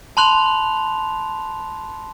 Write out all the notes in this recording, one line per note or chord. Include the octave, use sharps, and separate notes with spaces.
A5 B5 C6 F#6 F7